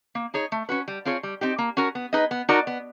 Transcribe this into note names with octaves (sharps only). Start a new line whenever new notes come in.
A#3
D#4 G#4 C#5
A3
C#4 F#4 B4
G3
C4 F4 G#4 C#5
G3
C4 D#4 G4
A#3
C#4 F#4 A#4
B3
D#4 G#4 B4 D#5
B3
D#4 F#4 A#4 D5
B3